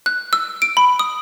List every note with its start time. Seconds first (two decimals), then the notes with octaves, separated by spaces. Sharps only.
0.06 F#6
0.33 E6
0.62 D7
0.77 B5
0.99 D#6